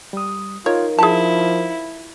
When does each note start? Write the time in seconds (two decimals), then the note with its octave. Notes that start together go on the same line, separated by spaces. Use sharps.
0.13 G3 D#6
0.66 D#4 F4 A#4 C#5
0.98 F3 E4 G#4 A5